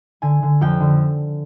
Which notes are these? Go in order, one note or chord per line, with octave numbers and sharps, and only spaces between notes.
D3 G#5
D3
F2 G5
D3